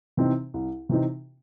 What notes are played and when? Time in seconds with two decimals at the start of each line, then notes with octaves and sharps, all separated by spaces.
0.17 C3 E3 C4 D#4
0.54 C2
0.89 C3 E3 C4 D#4